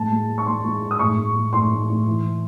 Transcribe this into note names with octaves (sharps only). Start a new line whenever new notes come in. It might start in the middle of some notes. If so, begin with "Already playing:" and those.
Already playing: A2 G#3 A5
G#3
G#3
C#6
G#3 C6
G#3
G#3
D#6
A2 C#6
A2
G#3
A2 C6
A2
A2
E3
E3